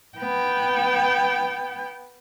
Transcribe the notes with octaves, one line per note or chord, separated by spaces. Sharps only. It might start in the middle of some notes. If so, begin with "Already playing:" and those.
B3 G5